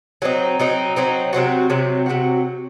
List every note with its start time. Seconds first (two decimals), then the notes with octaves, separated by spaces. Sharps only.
0.22 F#3 C4 D#4
0.60 F#3 C4 D#4
0.96 F#3 C4 D#4
1.33 C3 F#3 C4 F#4
1.70 C3 F#3 C4 F#4
2.06 C3 F#3 C4 F#4